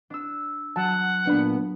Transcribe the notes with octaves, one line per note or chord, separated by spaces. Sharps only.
D4 E6
F#3 F#5 A5
A#2 B3 D4 B5